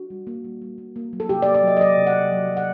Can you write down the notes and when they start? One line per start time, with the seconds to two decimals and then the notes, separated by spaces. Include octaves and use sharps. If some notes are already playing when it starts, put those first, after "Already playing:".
Already playing: D4 F#4
0.10 G3
0.27 A#3
0.44 G3
0.62 G3
0.78 A#3
0.96 A#3
1.13 F#3
1.20 A4
1.29 C3 G4
1.42 D5
1.46 A#3
1.55 D5
1.63 F#3 D#5
1.77 D#5
1.80 F#3 D5
1.97 C3
2.07 F#5
2.15 C3
2.32 F#3
2.49 F#3
2.57 F#5